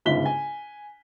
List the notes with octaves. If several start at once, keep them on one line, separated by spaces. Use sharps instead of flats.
G1 C#2 G#2 F4 B6 G7
G#5